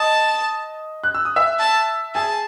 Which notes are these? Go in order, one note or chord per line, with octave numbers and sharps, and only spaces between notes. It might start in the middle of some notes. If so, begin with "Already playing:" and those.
Already playing: D#5 A5 D#6
F#6
E6
D#6
E5 E6
A5
G#4 G#5 A5